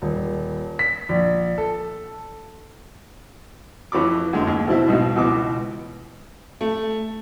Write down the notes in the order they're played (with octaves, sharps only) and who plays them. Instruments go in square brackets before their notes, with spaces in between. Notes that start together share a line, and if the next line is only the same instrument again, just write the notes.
[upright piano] D#1
B6
A#1
A4
[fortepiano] F2 E3 C#5 B5 D6
F#2 D3 G#3
D#2
B2 E3 A3 C4 E4
B1 G#2 B2
C#2 B2 E3 D6
[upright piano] A3